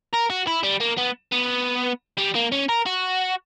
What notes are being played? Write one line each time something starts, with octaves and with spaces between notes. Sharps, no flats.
A#4
F#4
E4
G3
A#3
B3
B3
G3
A#3
C#4
A#4
F#4